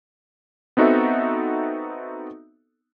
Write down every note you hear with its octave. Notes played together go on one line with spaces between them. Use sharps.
B3 C4 D#4 F#4 A4 E5